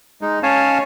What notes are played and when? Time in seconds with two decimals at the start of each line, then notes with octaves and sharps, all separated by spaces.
0.21 G#3 D#4
0.43 C#4 C#5 F5 G#5 A5